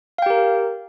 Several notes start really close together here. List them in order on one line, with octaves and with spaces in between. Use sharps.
F5 G5 G4 A#4